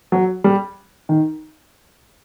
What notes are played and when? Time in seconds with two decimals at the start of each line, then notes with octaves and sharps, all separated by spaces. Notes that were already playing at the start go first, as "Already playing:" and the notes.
0.12 F#3
0.44 G3
1.09 D#3